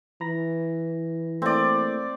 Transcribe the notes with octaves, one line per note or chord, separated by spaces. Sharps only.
E3 A#5 B5 A#6
A3 A#3 C4 E4 D5